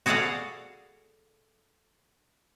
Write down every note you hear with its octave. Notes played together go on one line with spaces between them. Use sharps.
F#4 G#4 A4 D5 F5 F#5